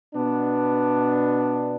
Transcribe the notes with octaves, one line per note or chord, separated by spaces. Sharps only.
B2 B3 D4